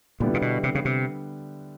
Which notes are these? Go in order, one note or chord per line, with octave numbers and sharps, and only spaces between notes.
A#2 D3 G3 B3 E4
A#2
B2
C3
C#3
C3